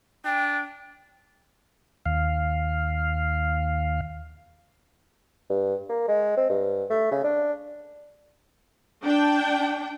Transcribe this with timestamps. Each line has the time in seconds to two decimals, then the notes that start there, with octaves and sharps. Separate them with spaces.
0.25 D4 G5
2.06 D#2 F5
5.50 G2
5.90 A#3
6.08 G#3
6.37 C4
6.50 G2
6.90 A3
7.11 C#3
7.24 D4
9.04 D4 G5